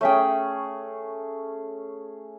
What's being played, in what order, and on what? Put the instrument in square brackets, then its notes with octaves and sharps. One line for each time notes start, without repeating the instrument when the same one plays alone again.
[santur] A3 C#4 G#4 [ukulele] C#5 E5 G5